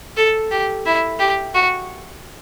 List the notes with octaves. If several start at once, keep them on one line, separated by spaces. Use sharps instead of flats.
A4
G4
E4
G4
F#4